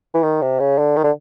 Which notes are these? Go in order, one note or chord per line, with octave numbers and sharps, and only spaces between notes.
E3
D#3
C3
C#3
D3
D#3
D3